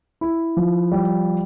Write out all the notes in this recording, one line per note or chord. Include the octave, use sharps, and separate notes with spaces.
E4
F3
G3